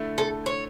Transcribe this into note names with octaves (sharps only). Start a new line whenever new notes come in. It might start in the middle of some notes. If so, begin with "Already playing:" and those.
Already playing: D3 A3 E4
A4
C#5